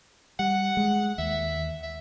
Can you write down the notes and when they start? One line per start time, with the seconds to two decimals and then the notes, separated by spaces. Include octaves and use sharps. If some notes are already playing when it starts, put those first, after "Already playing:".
0.39 G3 F#5
0.77 G#3
1.18 D#2 E5
1.83 E5